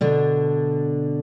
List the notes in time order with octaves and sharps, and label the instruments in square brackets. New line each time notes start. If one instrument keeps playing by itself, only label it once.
[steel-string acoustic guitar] B2 D3 D4